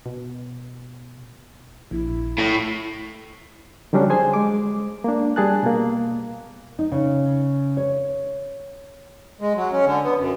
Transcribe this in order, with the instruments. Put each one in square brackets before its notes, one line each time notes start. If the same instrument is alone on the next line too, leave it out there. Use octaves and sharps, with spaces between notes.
[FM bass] B2
[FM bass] A#1 [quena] E4
[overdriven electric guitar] A2
[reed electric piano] D3 F#3 G3 C#4 D4
G#4 C5 G#5
G#3 D6
A#3 D4
G3 G#4 A5 F#6
B2 A#3
[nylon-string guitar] D#4
C#3
C#5
[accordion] G#3
F#3
C#4
D3
B3
F#2